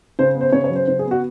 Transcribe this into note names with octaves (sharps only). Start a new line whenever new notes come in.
C#3 C5
B3
C5
C#3 C#5
C#5
F#3
C5
C#3 C5
G#4
B3
F#4